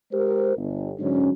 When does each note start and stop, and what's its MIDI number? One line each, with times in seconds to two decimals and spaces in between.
0.12 0.55 56
0.12 0.55 67
0.12 0.55 70
0.12 0.55 72
0.56 0.92 31
0.99 1.30 44
0.99 1.30 50
0.99 1.30 54
0.99 1.30 61